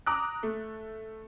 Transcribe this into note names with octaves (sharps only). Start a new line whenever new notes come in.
A#5 D6 D#6 F#6
A3